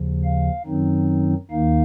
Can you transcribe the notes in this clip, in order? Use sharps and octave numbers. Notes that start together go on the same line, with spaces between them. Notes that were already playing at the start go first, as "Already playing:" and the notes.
Already playing: D#2 C#3 F3
F5
F#2 D#3 F#3 C4 D#4
D#2 D#3 A#3 D#4 F5